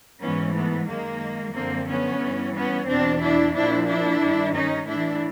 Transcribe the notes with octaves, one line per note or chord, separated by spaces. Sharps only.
G#2 E3 B3 C#4
A3 B3
F#2 D#3 G#3 A#3
F#2 D3 F3 A#3 C4
B3 C#4
G2 E3
B3 C#4
E2 B2 C4 D4
D4 E4
A#2 F3 D4 E4
D4 E4
G2 D#3
C#4 D#4
A2 E3 D4 E4